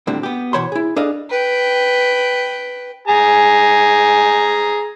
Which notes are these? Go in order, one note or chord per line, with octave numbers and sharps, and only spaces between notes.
D2 A2 D3 G3 C4
B3 G4
B2 E3 C5 C#5 B5 C6
E4 G#4
D4 G#4 A4 B4 D#5 F5
B4 G5
G#4 G#5 A#5